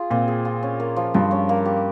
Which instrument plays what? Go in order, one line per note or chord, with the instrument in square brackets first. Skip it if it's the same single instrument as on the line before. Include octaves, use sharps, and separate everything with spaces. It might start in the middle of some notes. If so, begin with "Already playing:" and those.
Already playing: [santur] F4 G#4
[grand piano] A#2 [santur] C4
[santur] G#4
F4
C#4
A#3
F3
[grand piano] G2 [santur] F3
[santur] C#4
A#3
G4